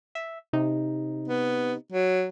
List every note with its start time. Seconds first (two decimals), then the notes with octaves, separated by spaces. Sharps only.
0.15 E5
0.53 C3 D#4
1.28 B3
1.92 F#3